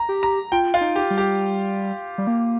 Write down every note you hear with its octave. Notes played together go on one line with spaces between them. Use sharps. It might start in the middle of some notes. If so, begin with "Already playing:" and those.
Already playing: A#5
G4
A#5
F4 G5
F4
D#4
G4
G3
G4
G3
A#3